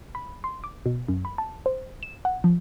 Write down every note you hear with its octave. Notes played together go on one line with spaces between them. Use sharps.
B5
C6
D6
B2
F#2
B5
A5
C5
E7
F#5
F3